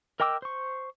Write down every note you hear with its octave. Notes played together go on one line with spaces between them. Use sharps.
A#4 D#5 G5 D6 E6
C5 C#6